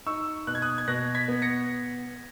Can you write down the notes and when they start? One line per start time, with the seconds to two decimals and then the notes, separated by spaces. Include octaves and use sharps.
0.06 D#4 C#6 E6
0.47 B2 F#6
0.55 G#6
0.62 D#6 F#6
0.78 G#6
0.88 B2 F#6 A#6
1.15 G#6 B6
1.28 B3
1.42 A#6 C#7